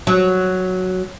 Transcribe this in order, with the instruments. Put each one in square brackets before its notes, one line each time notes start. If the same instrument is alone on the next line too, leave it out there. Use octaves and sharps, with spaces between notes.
[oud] F#3